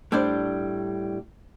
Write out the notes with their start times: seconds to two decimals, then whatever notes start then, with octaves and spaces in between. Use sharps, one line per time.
0.12 A2 G3 D4 C5 D5